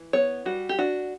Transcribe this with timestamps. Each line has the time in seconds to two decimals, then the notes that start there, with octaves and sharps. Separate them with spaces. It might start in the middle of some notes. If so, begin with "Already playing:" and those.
Already playing: E3
0.13 B3 C#5
0.45 G3 F#4
0.69 G4
0.78 D4 F#4